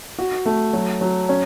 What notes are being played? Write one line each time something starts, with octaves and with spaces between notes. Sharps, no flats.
F#4
A3
F#3
F#3
C#4